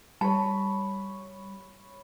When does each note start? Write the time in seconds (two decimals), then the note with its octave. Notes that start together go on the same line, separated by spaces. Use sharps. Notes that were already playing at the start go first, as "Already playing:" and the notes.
0.21 G3 C#5 A5 B5